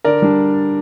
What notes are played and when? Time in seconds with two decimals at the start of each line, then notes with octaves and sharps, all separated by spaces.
0.04 D3 A#4 D5
0.22 G3 D4